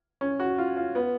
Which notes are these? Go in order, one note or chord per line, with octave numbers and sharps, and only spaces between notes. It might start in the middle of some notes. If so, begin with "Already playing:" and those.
C#4
F#4
F4
F4
B3